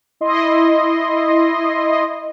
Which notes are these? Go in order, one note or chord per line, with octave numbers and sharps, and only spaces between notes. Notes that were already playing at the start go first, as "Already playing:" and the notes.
E4 D#5 C6